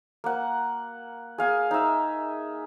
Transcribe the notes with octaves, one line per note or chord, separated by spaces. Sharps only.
A#3 F#5
G#4 F5 G#5
D#4 E5